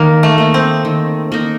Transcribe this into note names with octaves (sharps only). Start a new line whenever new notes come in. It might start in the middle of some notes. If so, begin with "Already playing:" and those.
Already playing: D#3 A#3
A3
A#3 D#4
C4
D#3
A#3 D#4